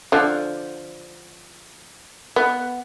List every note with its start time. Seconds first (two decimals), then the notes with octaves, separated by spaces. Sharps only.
0.12 D3 F3
2.36 B3